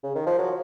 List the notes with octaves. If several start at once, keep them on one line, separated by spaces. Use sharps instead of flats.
C#3
D#3
F3
F#3